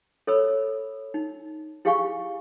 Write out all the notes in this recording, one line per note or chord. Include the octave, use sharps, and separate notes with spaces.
A4 C#5 B5 E6
D#4
E4 G4 G#4 F5 G#5 C#6